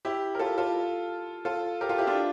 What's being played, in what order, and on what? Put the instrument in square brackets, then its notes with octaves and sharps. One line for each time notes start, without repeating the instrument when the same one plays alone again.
[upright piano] E4 G4
A#4
F4 A4
F4 A4
F4 A4
G4 A#4
F4 A4
E4 G4
D4 F4